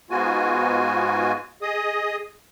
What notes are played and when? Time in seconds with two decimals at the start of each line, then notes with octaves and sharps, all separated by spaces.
0.10 G#2 G#3 B3 F4 F#4 G#5
1.62 G#4 D#5 D#6